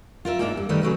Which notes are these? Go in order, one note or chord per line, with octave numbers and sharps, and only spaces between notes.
F4 A#4 B4 E5
G#2 A#3 D4 A4 E5
G2
D#3 G3 A3 B4
C#3 F#3 A3 B4